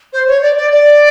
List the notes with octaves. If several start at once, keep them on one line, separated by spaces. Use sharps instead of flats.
C5
C#5
D5
D5
D5